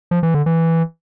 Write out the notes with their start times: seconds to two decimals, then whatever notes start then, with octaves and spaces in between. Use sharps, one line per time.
0.11 F3
0.23 E3
0.34 D3
0.46 E3